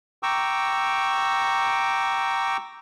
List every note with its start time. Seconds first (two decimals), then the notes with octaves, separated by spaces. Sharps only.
0.23 G5 A#5 C#6 D6 E6